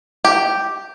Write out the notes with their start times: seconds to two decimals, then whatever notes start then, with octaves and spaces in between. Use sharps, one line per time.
0.25 G4